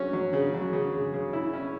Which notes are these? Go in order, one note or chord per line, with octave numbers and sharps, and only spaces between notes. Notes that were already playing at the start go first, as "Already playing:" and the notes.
Already playing: F#3 C#4
F#3
C#3
F#3
C#3
C#3
C#3
E4
C#4